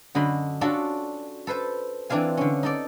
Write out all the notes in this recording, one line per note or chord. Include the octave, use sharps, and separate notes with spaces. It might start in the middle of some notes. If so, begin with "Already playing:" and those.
F#2 D3 D#5 B5 C6
C#4 D4 F4 F#4 A4 D5
A4 B4 C5 A5
E3 C4 D4 F4 F5 G#5
D3 C#4
D#4 A4 D5